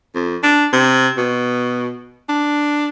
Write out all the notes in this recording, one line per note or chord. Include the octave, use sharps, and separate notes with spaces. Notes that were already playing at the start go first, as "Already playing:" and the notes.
F2
D4
C3
B2
D4